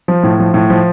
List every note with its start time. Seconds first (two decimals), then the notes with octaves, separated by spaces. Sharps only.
0.08 F3
0.23 A2
0.39 F3
0.54 A2
0.70 F3